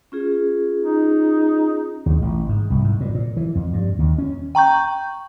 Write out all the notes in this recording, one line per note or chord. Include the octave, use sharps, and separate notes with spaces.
C#4 F4 G#4
D#4
D#2
A1
G#2
C2
G#2
A#2
A#2
E3
F2
G2
D#2
C#4
G5 A#5 C#6 G6